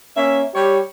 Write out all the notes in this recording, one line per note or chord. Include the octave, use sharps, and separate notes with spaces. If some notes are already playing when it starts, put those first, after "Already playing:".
A#3 C#4 E5
G3 G4 C#5